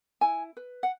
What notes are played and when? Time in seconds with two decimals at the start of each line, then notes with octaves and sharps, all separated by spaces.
0.21 E4 G#5
0.57 B4
0.83 F#5